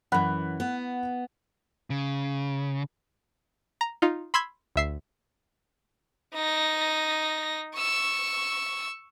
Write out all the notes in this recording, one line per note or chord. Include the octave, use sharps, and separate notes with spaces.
F#2 E3 F#5 B5 F#6
B3
C#3
A#5
D#4 F4
B5 C6 E6 G#6 B6
D2 E5 C7
D#4 A#6
C#6 E6